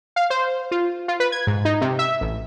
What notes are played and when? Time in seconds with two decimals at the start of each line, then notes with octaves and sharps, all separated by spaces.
0.16 F5
0.30 C5
0.71 F4
1.08 F4
1.20 B4
1.32 G#6
1.47 G#2
1.65 D#4
1.81 C3
1.99 E5
2.21 A1